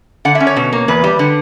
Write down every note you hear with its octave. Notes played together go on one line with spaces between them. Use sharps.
D3 F#5
E5
C#4
C#5
B2
A#3
E2 B4
G3
D3